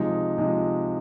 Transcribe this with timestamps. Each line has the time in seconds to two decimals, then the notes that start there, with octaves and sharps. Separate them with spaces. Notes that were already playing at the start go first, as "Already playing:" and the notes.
Already playing: C3 F3 G#3 D#4
0.38 C3 F3 G#3 D#4